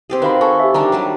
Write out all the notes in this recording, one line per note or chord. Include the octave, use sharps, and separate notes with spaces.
C4 G4 G#4
D#3 F#4 B4 F5 B5
A4 G#5 C#6
G4 E5
D#3 G3 D4 A#5
F#3 G3 A5